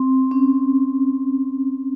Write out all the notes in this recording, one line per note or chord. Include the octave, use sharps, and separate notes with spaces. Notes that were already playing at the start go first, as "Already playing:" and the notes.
Already playing: C4
C#4